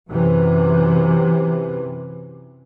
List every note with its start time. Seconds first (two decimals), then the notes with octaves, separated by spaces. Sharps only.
0.10 F#2 C3 E3